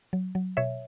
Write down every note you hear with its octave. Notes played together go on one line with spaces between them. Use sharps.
F#3
F#3
B2 C#5 E5